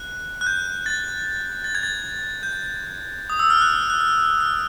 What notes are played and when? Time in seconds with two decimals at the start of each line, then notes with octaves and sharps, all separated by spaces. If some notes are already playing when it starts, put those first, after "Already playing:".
Already playing: F#6
0.41 F#6
0.46 G6
0.86 A6
1.64 A6
1.75 G#6
1.83 A6
2.43 G6
3.30 D#6
3.39 E6
3.50 F6
3.61 F#6
3.90 F#6
4.01 F6
4.40 F6